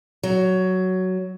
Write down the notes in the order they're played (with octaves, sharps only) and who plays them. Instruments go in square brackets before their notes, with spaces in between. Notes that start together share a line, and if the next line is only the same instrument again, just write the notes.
[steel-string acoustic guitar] F#3